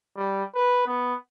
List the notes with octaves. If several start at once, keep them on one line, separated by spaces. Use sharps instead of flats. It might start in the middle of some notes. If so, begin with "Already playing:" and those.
G3
B4
B3